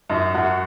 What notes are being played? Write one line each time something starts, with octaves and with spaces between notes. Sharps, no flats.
F#2 D#4
F#2 F#4